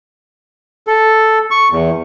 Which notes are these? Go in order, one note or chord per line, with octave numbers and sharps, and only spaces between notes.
A4
C#6
E2